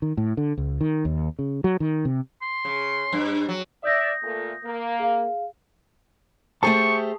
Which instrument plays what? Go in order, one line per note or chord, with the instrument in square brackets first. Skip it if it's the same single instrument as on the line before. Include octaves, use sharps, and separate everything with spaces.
[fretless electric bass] D#3
A2
D3
C#2
D#3
D#2
C#3
F#3
D#3
C3
[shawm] C6
[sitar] C#3
G2
F#3
[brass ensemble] D5 E5 [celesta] D#6 G6 A#6
[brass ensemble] A#2 A3
A#3
[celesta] G#4 F5
[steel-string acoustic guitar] A3 G4 C5 [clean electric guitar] G#4 A5 [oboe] C#6